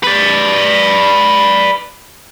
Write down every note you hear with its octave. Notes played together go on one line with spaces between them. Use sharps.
B4 D5